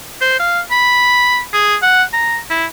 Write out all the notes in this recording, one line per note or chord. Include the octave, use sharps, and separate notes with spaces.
C5
F5
B5
G#4
F#5
A#5
E4